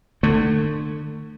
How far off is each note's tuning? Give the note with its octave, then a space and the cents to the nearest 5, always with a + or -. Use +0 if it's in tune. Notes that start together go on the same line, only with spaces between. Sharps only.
D3 +35 A3 +15